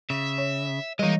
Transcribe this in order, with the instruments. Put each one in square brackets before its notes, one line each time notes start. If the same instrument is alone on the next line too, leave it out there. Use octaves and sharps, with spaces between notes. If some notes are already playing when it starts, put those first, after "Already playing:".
[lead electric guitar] C#3 [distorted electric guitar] E5
[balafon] C#5
[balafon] E3 G3 [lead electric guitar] G#3 A#3 [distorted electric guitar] D#4 D#5